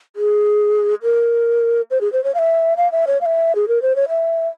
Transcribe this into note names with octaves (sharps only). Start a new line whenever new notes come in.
G#4
A#4
C5
G#4
C5
C#5
F5
E5
F5
E5
C#5
F5
E5
G#4
A#4
C5
C#5
E5